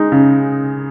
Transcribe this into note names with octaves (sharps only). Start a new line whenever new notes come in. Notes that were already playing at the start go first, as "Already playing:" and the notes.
Already playing: G#3 D#4
C#3